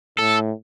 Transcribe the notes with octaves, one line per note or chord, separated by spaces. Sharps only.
A2 A4